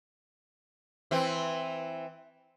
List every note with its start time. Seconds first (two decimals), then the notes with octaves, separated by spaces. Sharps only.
1.11 E3 C4